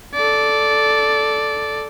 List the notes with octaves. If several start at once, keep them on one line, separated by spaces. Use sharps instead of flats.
A4 D5